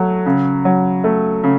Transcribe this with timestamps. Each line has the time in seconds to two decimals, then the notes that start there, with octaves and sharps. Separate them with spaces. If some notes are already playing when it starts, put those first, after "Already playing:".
Already playing: F#3 A3
0.26 C#3
0.65 F#3
1.04 A3
1.44 C#3